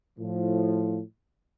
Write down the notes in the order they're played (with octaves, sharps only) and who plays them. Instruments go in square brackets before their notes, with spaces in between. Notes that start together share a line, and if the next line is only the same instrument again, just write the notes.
[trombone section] A2 F3